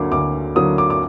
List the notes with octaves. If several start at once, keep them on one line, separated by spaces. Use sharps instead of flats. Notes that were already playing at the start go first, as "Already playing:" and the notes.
Already playing: D2 D3 F#3 A#3 D6
D2 D6
D3 F#3 A#3 D#6
D6
D6